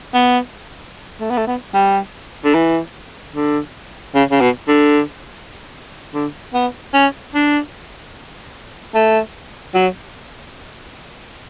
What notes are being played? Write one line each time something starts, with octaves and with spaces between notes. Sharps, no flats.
B3
A3
B3
A3
B3
G3
D3
E3
D3
C#3
C#3
B2
D3
D3
B3
C#4
D4
A3
F#3